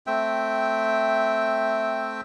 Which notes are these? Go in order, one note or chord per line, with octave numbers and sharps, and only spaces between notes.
A3 C4 E5 G5